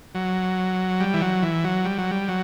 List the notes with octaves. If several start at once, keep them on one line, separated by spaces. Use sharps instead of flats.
F#3
G3
E3
F#3
E3
F#3
G3
F#3
G3
F#3